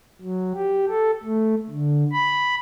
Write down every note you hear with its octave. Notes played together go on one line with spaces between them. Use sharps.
F#3
G4
A4
A3
D3
B5